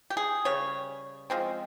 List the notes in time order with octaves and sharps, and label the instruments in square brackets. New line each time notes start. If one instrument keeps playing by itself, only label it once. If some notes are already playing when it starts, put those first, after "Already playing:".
[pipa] G4
G#4
C#3 G3 C#5
F3 G#3 C4